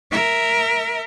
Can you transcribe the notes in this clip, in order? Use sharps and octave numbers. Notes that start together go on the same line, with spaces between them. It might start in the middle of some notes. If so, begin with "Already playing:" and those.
A#4 E5